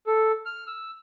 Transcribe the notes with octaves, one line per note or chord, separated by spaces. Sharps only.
A4
F6
E6